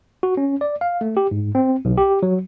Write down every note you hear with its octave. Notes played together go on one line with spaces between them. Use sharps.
F#4
C#4
D5
F5
A3
G4
G#2
C4
B1
G4
F#3